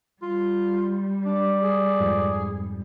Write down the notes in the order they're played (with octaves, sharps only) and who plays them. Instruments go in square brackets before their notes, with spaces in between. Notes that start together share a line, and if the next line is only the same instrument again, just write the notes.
[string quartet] G3 [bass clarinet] F4
[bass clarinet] D4 [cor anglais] D5
[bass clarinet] G#4
[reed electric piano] F2 G#2